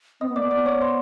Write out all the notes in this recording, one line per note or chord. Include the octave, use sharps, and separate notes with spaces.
C4 D#5 D#6
B3
A#3 D5 D6
B3
D5 D6
C#5 C#6
C5 C6